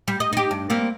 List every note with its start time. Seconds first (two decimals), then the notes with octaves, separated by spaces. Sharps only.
0.08 G3
0.20 D#5
0.33 D#4 G4
0.51 G2
0.70 G3 A#3 C4